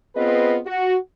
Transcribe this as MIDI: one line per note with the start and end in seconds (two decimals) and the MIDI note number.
0.15 0.58 59
0.15 0.58 60
0.15 0.58 65
0.15 0.58 68
0.15 0.58 71
0.15 0.58 75
0.66 0.95 66